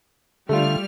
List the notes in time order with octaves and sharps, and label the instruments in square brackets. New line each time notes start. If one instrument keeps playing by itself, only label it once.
[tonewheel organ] D3 [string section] G3 F6 [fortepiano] A3 F4